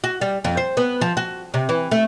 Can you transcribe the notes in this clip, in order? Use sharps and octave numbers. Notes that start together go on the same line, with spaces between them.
F#4
G3
F2
C5
B3
F3
F#4
C3
E3
A3